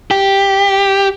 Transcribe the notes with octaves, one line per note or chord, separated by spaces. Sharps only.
G4